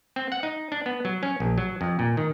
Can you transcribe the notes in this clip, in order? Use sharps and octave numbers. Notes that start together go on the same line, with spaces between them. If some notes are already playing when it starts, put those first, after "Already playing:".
C4
F#5
D#4
D4
B3
F#3
C#4
A#1
F#3
F2
A#2
D#3